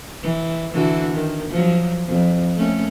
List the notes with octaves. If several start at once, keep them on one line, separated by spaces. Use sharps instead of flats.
E3
D3 E3 F#4
D#3
F3 F#3
F2
A3 A#3 C#4